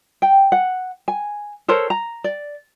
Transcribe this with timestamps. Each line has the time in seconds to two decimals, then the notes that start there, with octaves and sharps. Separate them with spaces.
0.22 G5
0.52 F#5
1.08 G#5
1.68 A4 A#4 C5 C#5
1.90 A#5
2.24 D5